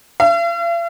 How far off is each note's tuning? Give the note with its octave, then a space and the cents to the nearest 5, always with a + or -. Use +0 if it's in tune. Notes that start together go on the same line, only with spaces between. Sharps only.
F5 -45